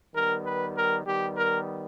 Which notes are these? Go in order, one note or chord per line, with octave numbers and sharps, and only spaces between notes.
D#3 G3 B3 A#4
B4
A#4
D#3 G3 B3 G4
A#4